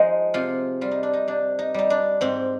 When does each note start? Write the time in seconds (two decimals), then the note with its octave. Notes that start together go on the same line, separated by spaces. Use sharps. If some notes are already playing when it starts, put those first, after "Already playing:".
Already playing: F3 G#3 D#4
0.34 C3 F4
0.81 G3 F4
0.91 D#4
1.03 D4
1.13 D#4
1.28 C3 D4
1.59 D#4
1.74 G3 D#4
1.90 D4
2.21 G#2 C4